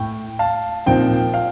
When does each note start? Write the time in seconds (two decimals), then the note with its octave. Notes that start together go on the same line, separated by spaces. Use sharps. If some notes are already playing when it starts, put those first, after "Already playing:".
Already playing: A2 G5
0.39 F5 A5
0.86 A#2 F3 C4 D#4 G5
1.34 F5